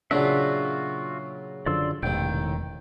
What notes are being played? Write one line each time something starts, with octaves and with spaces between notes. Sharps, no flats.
A#2 C#3 F#3 D4 F4 F#4 E5
F#2 D3 F3 D5 C6 E6
E1 A1 C3 D#3 G5